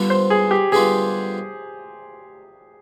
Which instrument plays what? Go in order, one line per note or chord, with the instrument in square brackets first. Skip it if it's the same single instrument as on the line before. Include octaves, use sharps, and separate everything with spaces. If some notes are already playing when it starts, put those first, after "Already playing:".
Already playing: [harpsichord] D3 G3 B3 F4
[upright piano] C5
G#4
G4
[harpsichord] D3 G3 B3 F4 [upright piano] G#4